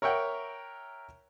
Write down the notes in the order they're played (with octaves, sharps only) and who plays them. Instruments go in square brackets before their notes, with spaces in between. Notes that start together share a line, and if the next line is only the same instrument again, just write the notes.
[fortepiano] A#4 C#5 E5 F#5 G5